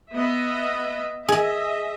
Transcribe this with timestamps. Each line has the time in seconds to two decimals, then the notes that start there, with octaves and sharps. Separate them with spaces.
0.13 B3 D#5 E5
1.28 G#4 D#5 E5